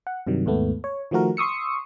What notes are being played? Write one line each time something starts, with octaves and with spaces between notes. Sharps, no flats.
F#5
G2 C3 D#3 F#3
D#2 G#2 A3 B3
C#5
D#3 F3 A3 F#4 A#4
C6 C#6 D#6 E6 C#7